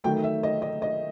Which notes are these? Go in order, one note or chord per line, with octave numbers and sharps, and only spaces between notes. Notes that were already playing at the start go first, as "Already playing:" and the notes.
D#3 F#3 A3 G5
E5
D#5
D#5
D#5